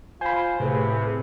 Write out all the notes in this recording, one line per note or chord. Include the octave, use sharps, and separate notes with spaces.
F4 C5 G#5 B5
A2 C3 A3 G#4 B4